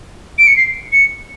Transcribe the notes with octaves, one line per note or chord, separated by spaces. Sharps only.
D7
C#7
C7
C#7